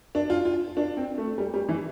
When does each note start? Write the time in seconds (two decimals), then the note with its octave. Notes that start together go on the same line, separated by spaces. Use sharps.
0.15 D4
0.30 F4
0.45 F4
0.77 D4
0.97 C4
1.18 A3
1.38 G3
1.54 G3
1.69 E3